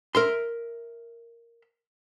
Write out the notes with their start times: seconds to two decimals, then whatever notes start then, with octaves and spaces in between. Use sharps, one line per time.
0.15 A#4 E5 C6